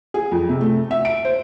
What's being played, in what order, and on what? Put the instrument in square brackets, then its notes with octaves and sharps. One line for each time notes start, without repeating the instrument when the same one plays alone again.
[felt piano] G#4
F2
C3
A3
E5
D7
C5